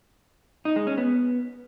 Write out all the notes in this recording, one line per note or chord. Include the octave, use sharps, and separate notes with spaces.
D#4
G#3
C#4
B3